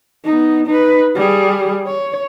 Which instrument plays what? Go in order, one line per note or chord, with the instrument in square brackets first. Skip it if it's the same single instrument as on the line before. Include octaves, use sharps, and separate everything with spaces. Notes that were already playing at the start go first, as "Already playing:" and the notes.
[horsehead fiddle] B3 D#4
D#4 B4
G3 G#4
C#5